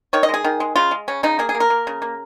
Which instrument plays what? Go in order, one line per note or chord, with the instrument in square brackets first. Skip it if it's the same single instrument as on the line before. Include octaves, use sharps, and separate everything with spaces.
[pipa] D#3 C#5
D#5
G#3 G#4
D#3
G#3
C#3 F4
G#3
C#3 C#4
C#3 D#4
A#3 G#4
G#4
A#3
A#4
A#3
C#3
A#3